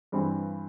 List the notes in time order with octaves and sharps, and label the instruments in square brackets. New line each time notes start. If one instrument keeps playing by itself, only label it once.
[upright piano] G2 E3 G3 C4